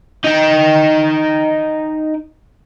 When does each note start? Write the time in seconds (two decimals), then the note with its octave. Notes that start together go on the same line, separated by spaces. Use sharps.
0.24 D#4 G5